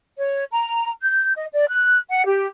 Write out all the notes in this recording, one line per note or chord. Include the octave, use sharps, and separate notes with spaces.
C#5
A#5
G6
D#5
D5
F#6
F#5
G4